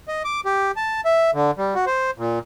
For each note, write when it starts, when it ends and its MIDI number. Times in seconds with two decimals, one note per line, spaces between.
0.08 0.23 75
0.25 0.40 86
0.45 0.71 67
0.77 1.01 81
1.05 1.31 76
1.34 1.51 50
1.58 1.74 55
1.75 1.85 66
1.87 2.11 72
2.18 2.39 46